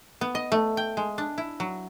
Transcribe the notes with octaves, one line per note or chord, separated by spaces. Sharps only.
B3
D#5
A3
G5
G#3
D4
E4
F#3